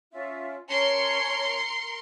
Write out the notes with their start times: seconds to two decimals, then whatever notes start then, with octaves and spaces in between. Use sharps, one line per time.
0.12 C#4 F4 E5
0.69 C#4 A#4 C#5 A5 C6 C#7